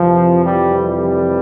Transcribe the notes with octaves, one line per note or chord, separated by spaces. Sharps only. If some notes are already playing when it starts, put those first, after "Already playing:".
Already playing: F2 C3 E3 F3
G3
G3